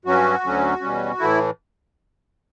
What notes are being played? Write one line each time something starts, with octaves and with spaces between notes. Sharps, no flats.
G2 F#3 C#4 F#4
D2 D3 F#3 C#4
E2 B2 G3 C#4
A2 E3 A3 E4